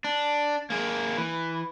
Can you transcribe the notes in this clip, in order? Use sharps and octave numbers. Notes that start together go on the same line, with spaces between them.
D4
A#3 G#4
E3